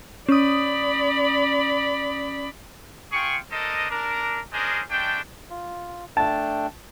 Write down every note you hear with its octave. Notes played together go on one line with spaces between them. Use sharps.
C#4 D5 B5 D#6
F4 G#4 G5 C#6
D4 A4 A#4 C5 D#5
D4 A#4
C#4 D4 G#4 A#4 C5 D#5
G#3 A3 D4 G5
F4
A3 D4 G5 A5